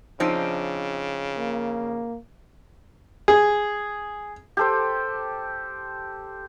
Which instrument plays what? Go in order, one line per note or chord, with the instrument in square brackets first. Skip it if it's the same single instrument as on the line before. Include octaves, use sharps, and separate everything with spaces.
[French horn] C#3 [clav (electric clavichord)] F3 [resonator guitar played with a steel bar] C4 D4 D#4
[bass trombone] A#3
[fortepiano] G#4
[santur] G4 A4 C5